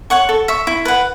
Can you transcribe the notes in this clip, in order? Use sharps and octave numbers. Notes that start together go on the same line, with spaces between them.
C#5 F#5 C#6
A4
E5 C#6
E4
B4 F#5